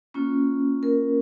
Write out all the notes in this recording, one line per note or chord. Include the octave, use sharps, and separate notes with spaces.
A#3 C#4 F4
A#4